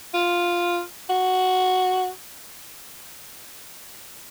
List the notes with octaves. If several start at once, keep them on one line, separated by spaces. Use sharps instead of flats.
F4
F#4